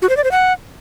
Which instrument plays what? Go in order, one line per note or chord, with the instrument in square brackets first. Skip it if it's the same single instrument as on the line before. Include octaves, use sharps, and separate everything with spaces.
[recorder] F#4
C5
D5
C5
F#5